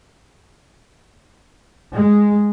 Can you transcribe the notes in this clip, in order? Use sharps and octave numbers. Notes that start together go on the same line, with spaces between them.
G#3